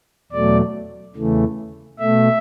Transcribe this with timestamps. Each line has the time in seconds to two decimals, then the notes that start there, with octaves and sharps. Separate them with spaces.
0.32 E2 B2 F#3 A3 D5
1.16 E2 C#3 E3 A3
1.99 B2 A3 E5